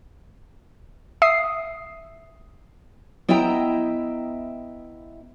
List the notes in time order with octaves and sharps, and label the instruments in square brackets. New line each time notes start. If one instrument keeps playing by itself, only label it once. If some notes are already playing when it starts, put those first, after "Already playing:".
[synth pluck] E5 D#6 C7
[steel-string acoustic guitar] B3 E4 D#5 E5 G5 A#5